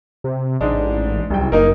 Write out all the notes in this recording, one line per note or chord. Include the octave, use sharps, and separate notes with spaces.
C3
A1 G#2 G#3 D4
D1 C2 G5
F#1 A#3 D#4 A#4